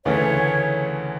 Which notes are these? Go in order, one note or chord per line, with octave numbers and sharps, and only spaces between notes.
D2 C#3 E3 A3 C#4 C#5